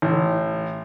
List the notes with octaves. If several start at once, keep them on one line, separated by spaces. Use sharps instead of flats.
A1